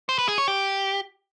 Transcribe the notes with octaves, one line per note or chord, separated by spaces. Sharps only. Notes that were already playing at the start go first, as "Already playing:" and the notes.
C5
B4
G#4
C#5
G4